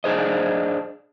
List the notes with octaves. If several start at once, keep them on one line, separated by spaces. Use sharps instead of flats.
D4 G#4 C5 D#5